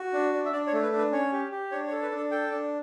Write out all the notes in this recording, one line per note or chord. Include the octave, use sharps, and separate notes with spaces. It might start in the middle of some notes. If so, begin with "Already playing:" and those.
Already playing: F#4
D4
D4
E5
D4 D5
C#5
A3
B4
D4
B4
C#4 C#5
G4
G4
D4 C#5
C#5
A4
B4
D4
A4
A4 G5
D4